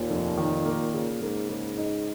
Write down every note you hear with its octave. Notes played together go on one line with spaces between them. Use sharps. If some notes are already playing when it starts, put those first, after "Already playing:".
Already playing: D#2 A#2
F1
D#3
A#3
C#3
G#2 A#3
C#3
D#4